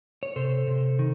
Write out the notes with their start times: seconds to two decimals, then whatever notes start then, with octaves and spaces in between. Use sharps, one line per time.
0.23 C#5
0.36 C3 A4 C5
0.67 C3
0.99 D#3